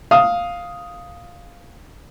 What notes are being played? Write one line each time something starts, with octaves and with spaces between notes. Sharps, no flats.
F5 D#6